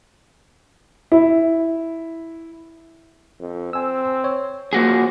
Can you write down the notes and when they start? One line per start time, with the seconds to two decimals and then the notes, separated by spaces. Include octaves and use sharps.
1.12 E4
3.40 F2
3.73 C4 G#5 E6
4.24 C#5
4.73 F3 A#3 F#4 G#4